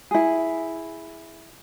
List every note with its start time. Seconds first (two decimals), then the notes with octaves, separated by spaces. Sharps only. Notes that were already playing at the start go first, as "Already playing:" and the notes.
0.11 E4 G#4